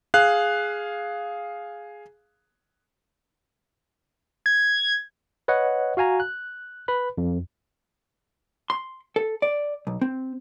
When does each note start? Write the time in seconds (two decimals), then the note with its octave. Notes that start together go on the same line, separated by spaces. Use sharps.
0.14 G#4 F5 F#6
4.46 G#6
5.48 B4 C#5 D#5 F#5
5.97 F#4 F5 G#5 A#5
6.20 F#6
6.88 B4 B5
7.18 F2
8.70 C6
9.16 A4
9.42 D5
9.87 B1
10.01 C4